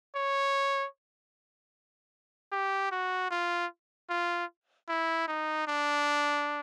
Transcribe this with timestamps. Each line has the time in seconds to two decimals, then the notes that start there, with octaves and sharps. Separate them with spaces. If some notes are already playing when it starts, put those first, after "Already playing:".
0.16 C#5
2.52 G4
2.91 F#4
3.31 F4
4.10 F4
4.89 E4
5.28 D#4
5.67 D4